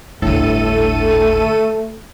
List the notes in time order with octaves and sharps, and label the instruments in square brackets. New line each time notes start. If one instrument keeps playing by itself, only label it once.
[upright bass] G1 D2 [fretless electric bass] A2 [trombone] A3 [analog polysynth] A4 D#7